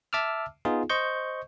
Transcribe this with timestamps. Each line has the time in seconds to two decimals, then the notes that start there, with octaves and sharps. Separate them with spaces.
0.13 E5 A5 D6 E6 F6
0.65 B3 D#4 F4 G#4
0.90 C5 D#5 C#6 G6